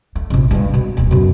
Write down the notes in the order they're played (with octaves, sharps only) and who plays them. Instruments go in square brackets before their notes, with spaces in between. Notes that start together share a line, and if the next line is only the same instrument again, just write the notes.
[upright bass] A3
A#1 C3
G2 G#3
B2
D#1 B3
F#2 B2